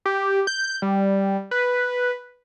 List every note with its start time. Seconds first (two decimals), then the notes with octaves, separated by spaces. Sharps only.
0.05 G4
0.47 G6
0.82 G3
1.51 B4